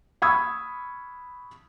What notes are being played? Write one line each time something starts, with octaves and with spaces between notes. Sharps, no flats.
B5 C#6 D#6 E6 G#6